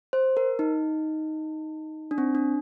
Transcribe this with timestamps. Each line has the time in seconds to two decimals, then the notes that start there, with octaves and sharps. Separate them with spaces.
0.13 C5
0.37 A#4
0.59 D#4
2.11 D4
2.18 C4
2.35 D4